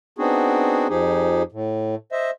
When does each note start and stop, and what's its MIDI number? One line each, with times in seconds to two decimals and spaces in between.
0.19 0.87 59
0.19 0.87 60
0.19 0.87 62
0.19 0.87 63
0.19 0.87 66
0.19 0.87 68
0.90 1.43 41
0.90 1.43 53
0.90 1.43 63
0.90 1.43 67
0.90 1.43 68
1.52 1.95 45
2.12 2.30 72
2.12 2.30 75
2.12 2.30 76